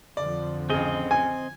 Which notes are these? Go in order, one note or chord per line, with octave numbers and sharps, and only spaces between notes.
F2 D3 F3 D5
A1 C#3 C4 G#4 D#5
G#5